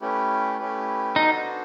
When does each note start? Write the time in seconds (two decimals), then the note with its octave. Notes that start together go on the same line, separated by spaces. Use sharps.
0.01 A3 C#4 E4 G4 B4
0.58 A3 C#4 E4 G4 B4
1.16 B3 D4 D#4 F#4 A4 C5